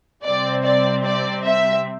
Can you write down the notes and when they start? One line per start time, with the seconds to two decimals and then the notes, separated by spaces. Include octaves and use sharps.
0.24 C3 G3 C4 D5
0.65 D5
1.06 D5
1.46 E5